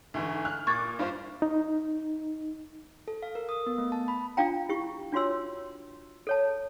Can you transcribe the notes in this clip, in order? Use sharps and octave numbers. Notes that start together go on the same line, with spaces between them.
D2 G#2 E3
F6 F#6
A#2 C#6 D6 G#6 A6
G2 F4 C5
D#4
A4
F5
A#4
D#6
B3
A3
A5
B5
D4 F4 F5 G5 A#5
E4 G4 C#6
D4 F4 F#4 C#5 C6 E6
A4 C#5 A5